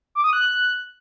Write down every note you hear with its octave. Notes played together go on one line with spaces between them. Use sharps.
D6
D#6
F#6